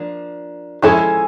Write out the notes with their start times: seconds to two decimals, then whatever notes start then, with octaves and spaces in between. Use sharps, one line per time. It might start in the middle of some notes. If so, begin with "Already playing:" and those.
Already playing: F3 A#3 D4
0.82 F3 G#3 C#4 E4 A4 G#5